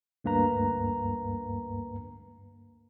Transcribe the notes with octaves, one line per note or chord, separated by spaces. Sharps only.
D2 G2 A#3 B4 A#5